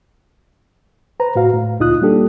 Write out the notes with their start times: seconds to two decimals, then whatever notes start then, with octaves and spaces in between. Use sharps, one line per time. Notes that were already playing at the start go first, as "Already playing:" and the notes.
1.20 B4 C5 A#5
1.35 A2 F#4 F5
1.54 A2
1.80 D2 A#2 D#4 F4 D#6 F#6
2.02 G3 A#3 D4 G4 A4